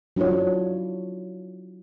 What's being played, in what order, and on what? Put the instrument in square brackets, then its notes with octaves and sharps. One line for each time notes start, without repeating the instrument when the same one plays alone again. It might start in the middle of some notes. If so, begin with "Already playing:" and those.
[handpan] F#3 D4 E4 F4 C#5